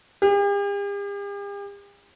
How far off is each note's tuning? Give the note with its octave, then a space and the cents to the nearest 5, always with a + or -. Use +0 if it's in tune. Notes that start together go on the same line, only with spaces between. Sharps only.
G4 +45